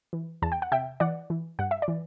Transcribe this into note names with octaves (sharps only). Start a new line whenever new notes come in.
E3
E2 A5
G5
F#5
C3 E5 G5
E3 D5 F#5
E3
G2 F#5
E5
D5
E3